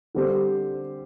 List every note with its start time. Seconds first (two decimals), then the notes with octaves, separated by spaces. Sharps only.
0.15 D3 G3 C4 G4 C5